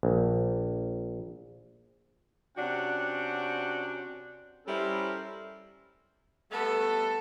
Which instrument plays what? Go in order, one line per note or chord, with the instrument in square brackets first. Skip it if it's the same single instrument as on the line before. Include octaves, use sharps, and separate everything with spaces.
[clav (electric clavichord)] A#1
[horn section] C3 C#4 D4 F#4 F#5 G5
G3 C#4 E4 A4 A#4 C5
[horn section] G3 A3 B3 [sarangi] A4